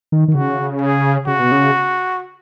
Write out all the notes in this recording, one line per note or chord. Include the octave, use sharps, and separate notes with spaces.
D#3
D#3
C#3 F#4
G#4
C#3 F#4
B2
C#3